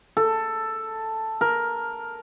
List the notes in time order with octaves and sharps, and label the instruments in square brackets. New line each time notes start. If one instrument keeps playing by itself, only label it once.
[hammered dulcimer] A4
A#4